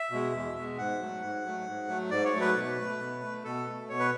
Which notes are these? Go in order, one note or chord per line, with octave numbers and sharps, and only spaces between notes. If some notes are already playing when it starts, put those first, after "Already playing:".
Already playing: E5
B2 G#3
E2
B2 G#3
G#2 F#5
F#3 A3
G#2
F#3 A3
G#2
F#3 A3
G#2 D5
C#5
F#3 A3
B4
B2
A3
B2
A3
B2 A4
A3
B2 C#5
B4